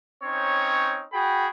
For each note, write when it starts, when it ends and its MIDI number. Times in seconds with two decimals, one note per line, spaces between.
0.24 1.04 60
0.24 1.04 61
0.24 1.04 63
0.24 1.04 73
1.13 1.48 66
1.13 1.48 68
1.13 1.48 79
1.13 1.48 83